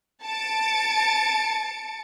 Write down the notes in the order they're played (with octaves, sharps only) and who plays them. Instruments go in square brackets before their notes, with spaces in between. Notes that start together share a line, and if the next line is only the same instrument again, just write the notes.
[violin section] A5 A6 C#7 D7